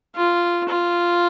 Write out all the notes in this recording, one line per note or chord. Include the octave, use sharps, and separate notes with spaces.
F4
F4